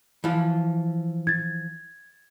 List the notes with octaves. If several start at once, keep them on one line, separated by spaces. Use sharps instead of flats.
E3 F3
G#6 A6